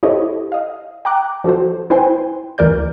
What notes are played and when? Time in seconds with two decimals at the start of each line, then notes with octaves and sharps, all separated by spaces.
0.03 E4 G4 A4 C5 C#5 D#5
0.52 D#5 F5
1.05 G5 A#5 D6 F#6
1.44 F3 F#4 A4 C5
1.90 E4 B4 C5 G5 G#5 C6
2.58 D2 E3 A#4 D5 G6